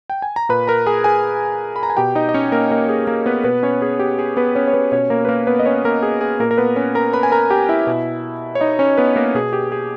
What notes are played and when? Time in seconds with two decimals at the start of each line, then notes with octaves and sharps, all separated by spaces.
0.10 G5
0.22 G#5
0.36 A#5
0.49 A#2 B4 B5
0.67 A#4 A#5
0.87 G#4 G#5
1.04 G#4 G#5
1.76 B5
1.83 A#5
1.90 G#5
1.97 B2 G4 G5
2.15 D#4 D#5
2.29 D#5
2.34 C#4 C#5
2.52 A#3 A#4
2.71 A#3 A#4
2.89 G#4
3.07 A#3 A#4
3.26 B3 B4
3.44 B2 B3 B4
3.63 C#4 C#5
3.82 G#4
3.99 G4
4.19 G#4
4.37 B3 B4
4.55 C#4 C#5
4.67 C#5
4.73 B3 B4
4.92 B2 C#4 C#5
5.10 A#3 A#4
5.25 B4
5.29 A#3 A#4
5.47 B3 B4
5.59 D#5
5.66 C#4 C#5
5.85 A#3 A#4
6.03 G#4
6.21 G#4
6.40 A#2 A#3 A#4
6.51 A#4
6.58 B3 B4
6.76 C#4 C#5
6.95 A#4 A#5
7.13 B4 B5
7.23 G#5
7.32 A#4 A#5
7.50 G4 G5
7.69 E4 E5
7.87 B2
8.55 C#5
8.61 D#4 D#5
8.79 C#4 C#5
8.97 B3 B4
9.16 A#3 A#4
9.34 B2 G#4
9.53 G4
9.72 G#4